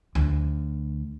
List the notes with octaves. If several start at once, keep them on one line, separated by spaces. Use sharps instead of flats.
D2